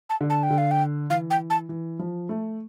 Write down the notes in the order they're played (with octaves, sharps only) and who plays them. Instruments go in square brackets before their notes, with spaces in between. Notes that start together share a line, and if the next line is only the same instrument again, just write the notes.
[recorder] A5
[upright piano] D3
[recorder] A5
G5
[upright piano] D3
[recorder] F5
G5
[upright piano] E3 [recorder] F5
[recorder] G5
A5
[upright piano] E3
F3
A3